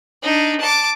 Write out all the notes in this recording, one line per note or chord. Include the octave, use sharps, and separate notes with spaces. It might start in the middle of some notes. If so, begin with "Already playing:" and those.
D4 D#4
A5 D6